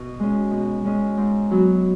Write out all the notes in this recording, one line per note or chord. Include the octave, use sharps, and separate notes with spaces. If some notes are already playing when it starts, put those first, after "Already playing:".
Already playing: B2
G#3 C#4
B2
G#3 C#4
G#2
F#3 B3 F#4